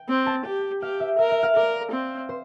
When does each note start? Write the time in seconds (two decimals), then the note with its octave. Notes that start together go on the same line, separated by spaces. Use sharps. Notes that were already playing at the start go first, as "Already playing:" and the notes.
Already playing: G5
0.09 C4
0.26 A5
0.45 G4 G5
0.82 G4 F5
1.00 E5
1.19 A#4 E5
1.31 E5
1.43 F5
1.56 A#4 D5
1.92 C4
2.29 C5